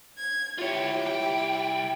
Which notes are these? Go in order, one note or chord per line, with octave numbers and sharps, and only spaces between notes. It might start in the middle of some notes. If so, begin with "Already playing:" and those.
G#6
E4 F4 G4 C#5
C2 G5